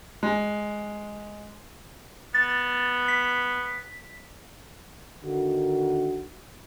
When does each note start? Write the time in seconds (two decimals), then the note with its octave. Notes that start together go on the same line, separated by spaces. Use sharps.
0.23 G#3
2.34 B3 A6
3.08 B6
5.23 D3 D#3 A#3 F#4